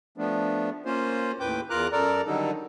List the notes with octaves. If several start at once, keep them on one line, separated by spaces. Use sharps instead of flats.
F3 A3 B3 D4
A#3 C#4 F4 C5
D#2 A2 B4 G5 D6 G6
E2 F4 A#4 A#5 D6 F#6
F#2 A4 A#4 D5 A#5
D3 D#3 F#3 G3 D#4 A4